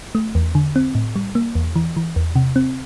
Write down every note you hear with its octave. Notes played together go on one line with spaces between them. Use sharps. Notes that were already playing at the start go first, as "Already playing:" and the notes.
A3
E2
D3
C4
A2
G3
A#3
E2
E3
E3
E2
C3
C4